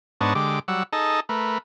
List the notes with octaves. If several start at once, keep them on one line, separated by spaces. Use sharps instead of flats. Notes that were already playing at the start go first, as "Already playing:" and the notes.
G#2 B3 D4 C#5 D#5 A5
D3 G#3 G4 D6
F#3 G3 F#5 E6
D#4 G#4 A4 D#5 A5
A3 A#4 B4